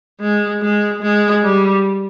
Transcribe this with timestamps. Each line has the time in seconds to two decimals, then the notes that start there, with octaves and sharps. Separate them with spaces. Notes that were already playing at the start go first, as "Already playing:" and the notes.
0.20 G#3
0.62 G#3
1.02 G#3
1.43 G3